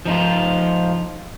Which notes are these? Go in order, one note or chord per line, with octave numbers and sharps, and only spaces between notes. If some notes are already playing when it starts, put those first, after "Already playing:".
F3 D#4 F4